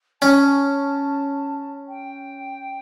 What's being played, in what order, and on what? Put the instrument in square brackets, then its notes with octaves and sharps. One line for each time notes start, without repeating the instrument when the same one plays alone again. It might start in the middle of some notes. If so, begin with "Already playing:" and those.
[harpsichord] C#4 [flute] A5
[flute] G5